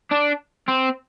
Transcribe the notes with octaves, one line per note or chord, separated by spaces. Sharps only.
D4
C4